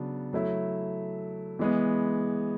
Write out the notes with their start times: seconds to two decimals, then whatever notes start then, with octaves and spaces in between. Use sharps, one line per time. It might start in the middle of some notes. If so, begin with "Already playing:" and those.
Already playing: C#3 F#3 B3 D4 F#4
0.33 F#3 A3 E4
1.59 E3 G#3 B3